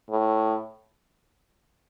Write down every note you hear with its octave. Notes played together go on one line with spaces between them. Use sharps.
A2